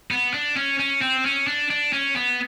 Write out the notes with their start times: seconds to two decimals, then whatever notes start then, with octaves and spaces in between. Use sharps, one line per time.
0.11 B3
0.34 D4
0.57 C#4
0.79 C#4
1.02 C4
1.25 C#4
1.47 D4
1.70 D4
1.93 C#4
2.16 B3